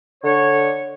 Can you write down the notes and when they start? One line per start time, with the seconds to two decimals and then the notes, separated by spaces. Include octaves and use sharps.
0.23 D3 C#5